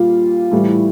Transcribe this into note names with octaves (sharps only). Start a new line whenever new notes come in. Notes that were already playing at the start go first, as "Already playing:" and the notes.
Already playing: A#2 G3 F4
A2 E3 G3